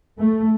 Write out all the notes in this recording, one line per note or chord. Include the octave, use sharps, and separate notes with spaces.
A3